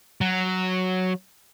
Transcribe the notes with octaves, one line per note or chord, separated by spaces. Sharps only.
F#3